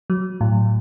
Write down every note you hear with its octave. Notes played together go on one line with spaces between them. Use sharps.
F#3
A2